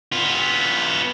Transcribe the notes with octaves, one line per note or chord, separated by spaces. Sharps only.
B3 F4